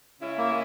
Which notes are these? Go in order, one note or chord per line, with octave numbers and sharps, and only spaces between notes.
C#3 G#3 C#4 E4
A#3